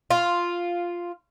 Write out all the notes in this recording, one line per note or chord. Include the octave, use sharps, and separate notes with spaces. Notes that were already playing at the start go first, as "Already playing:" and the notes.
F4